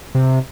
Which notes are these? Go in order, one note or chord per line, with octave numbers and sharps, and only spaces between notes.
C3